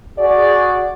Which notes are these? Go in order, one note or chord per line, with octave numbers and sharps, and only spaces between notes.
F#4 G#4 D5